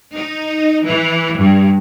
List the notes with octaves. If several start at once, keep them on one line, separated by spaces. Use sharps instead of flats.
D#4
E3
G2